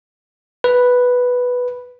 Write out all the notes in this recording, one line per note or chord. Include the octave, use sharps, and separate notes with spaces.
B4